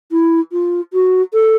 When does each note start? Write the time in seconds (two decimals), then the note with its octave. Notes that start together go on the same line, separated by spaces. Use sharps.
0.11 E4
0.52 F4
0.93 F#4
1.33 A4